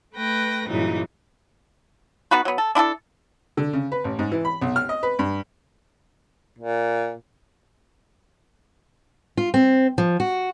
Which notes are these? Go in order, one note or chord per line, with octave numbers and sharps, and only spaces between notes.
A3 B4 G5 A#6
G2 A#2 C#3 E3 F#3 D#4
B3 D#4 F#4 B4
F#3 B3
A4
D4 E4 G4 A4
D3
C#3
B4
A1
G#2
E3
B5
B1
F6
D#5
B4
G2
A#2
F4
C4
F3
F#4